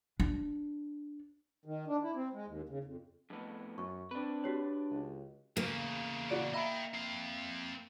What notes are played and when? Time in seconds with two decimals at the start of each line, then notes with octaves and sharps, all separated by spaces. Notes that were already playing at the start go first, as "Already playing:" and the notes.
0.20 D4
1.65 D#3
1.87 D4
2.03 E4
2.15 C4
2.33 G#3
2.46 D#2
2.69 C#3
2.84 F2
3.30 F2 A2 B3
3.78 F#2 C#6
4.11 C4 D4 B4
4.44 F#4 G4 C#5
4.91 C#2
5.57 E2 C#3 A#3
6.29 F#4 D5 D7
6.54 D#5 E5 G5 A#5 B5
6.94 C4 F5